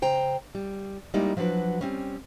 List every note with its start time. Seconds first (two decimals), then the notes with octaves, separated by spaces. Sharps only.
0.02 C#3 C5 G5 A#5
0.55 G3
1.14 G3 G#3 A#3 D#4 E4
1.37 F3 F#3 D4 F#4 B4
1.81 G3 C4 C#4